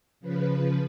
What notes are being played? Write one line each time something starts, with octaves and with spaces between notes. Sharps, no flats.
C#3 F3 B4